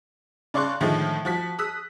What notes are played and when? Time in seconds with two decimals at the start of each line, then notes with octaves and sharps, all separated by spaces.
0.54 C#3 D5 C6 C#6 F#6
0.81 A2 D3 D#3 F3 G#3 A3
1.25 F3 F#4 B6
1.59 D#6 E6 F#6 B6